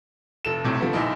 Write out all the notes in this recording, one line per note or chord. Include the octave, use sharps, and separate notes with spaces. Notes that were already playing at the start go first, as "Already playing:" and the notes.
F1 A4 E7
B1 A2 C3
D3 F3 A3 B3
A#1 A#2 F3 D#4 E4